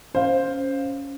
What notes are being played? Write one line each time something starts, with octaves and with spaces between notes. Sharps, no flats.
C#4 C5 F5